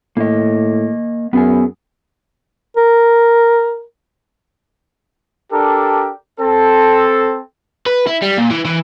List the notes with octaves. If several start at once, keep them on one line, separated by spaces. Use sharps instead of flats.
A2 A#3 D#5
F#2 B3 G#4 G#5
A#4
D4 G4 A4 A#4
C4 A4
B4
E4
G3
A#2
E3
E3